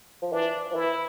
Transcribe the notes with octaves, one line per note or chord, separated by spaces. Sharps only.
F3
E3 D4
F3
E3 E4